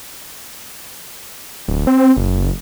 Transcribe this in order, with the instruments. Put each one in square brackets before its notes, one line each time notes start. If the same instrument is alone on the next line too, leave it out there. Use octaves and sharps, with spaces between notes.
[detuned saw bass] D1
C4
F#1